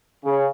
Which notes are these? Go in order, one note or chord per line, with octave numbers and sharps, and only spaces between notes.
C#3